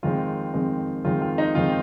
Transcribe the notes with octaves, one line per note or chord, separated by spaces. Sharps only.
F2 D#3 G#3 C4 F4
F2 D#3 G#3 C4
F2 D#3 G#3 C4 F4
F4
D#4
F2 D#3 G#3 C4 F4